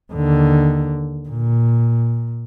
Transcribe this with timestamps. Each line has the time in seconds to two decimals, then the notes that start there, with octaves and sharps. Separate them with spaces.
0.13 D#2 D3
1.29 A#2